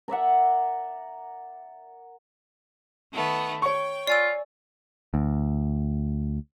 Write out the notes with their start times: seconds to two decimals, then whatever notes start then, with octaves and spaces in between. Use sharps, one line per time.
0.08 A#4 D5 E5 F#5
3.11 D#3 A3 B3
3.62 C#5 G5 C#6
4.07 F4 D5 G#5 E6
5.14 D2